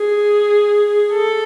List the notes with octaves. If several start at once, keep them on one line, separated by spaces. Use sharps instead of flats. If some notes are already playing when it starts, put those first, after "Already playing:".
Already playing: G#4
A4